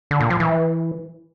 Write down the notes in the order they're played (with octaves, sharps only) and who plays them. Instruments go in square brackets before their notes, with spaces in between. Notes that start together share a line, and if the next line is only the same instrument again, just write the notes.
[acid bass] D3
A#2
F3
E3